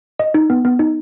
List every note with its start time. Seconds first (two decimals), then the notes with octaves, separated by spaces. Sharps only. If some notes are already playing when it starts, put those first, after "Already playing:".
0.19 D#5
0.34 D#4
0.50 B3
0.65 B3
0.79 D#4